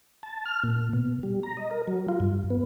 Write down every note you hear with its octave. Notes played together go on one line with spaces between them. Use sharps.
A5
F6
A#2
B2
G3
A#5
D#5
A#4
F#3
F4
G2
B3